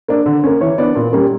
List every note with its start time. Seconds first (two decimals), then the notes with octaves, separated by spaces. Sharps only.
0.08 A#3 D4
0.26 D3
0.44 A#3 C#4
0.61 E3 C#5
0.78 B3 D4 D5
0.95 A#2
1.13 G3 A#3 C#4